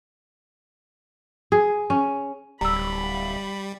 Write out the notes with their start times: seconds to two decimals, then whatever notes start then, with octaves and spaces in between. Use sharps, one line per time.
1.52 G#4
1.90 C#4
2.61 D1 G3 A#5 B5 E6